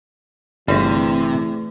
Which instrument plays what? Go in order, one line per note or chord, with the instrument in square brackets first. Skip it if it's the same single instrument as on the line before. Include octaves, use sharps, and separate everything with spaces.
[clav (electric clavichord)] G1 [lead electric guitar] C3 [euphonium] E3 [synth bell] A3 G#4